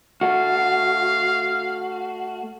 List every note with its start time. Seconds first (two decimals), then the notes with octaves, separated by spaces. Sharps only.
0.21 A3 F#4 F5